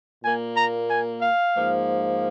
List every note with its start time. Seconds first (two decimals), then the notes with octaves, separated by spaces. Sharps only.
0.23 A#2 A#3 G#5
0.56 A#5
0.89 G#5
1.22 F5
1.56 G#2 F3 A#3